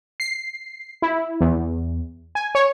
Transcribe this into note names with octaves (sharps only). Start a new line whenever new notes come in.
C7
E4
E2
G#5
C#5